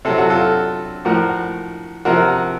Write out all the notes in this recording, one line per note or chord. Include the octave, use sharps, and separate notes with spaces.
C3 F#3 A4
F#4
F4 A4
A2 F3 F#4 A#4
C3 F3 F#4 A#4